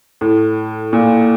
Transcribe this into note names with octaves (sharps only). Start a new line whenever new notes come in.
A2
A#2